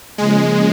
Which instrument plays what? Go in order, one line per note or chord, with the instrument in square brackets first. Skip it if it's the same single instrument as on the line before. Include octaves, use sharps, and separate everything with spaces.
[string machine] C#3 F3 A#3 C#4 [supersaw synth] G#3